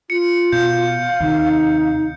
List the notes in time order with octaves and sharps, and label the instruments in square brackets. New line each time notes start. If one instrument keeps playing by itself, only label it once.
[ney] F4 [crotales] C#7
[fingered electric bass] B2 [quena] F5 [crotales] G6
[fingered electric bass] D#2 C3 [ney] D#4